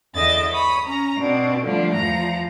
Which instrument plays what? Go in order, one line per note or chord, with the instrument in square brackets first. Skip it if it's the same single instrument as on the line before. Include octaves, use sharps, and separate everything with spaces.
[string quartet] E2 D3 D#5 E5 A6
C#5 B5 D#6
C#4 A#5
B2 C4 D4
D3 F3 G3 A3 D4
E2 F3 A#5